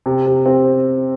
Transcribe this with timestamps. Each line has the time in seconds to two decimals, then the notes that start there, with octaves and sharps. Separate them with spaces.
0.06 C3
0.26 C3
0.46 C4